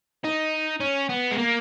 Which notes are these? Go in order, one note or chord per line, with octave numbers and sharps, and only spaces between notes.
D#4
C#4
B3
G#3
A#3